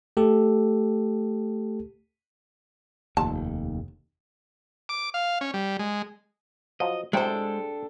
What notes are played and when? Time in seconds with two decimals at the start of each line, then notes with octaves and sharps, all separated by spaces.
0.17 A3 G4 A4
3.17 F1 D#2 A5
4.89 D6
5.14 F5
5.41 C#4
5.54 G3
5.79 G#3
6.80 F3 F#3 D#5
7.13 A2 C3 F#3 G#3 D4 A4 C5 G5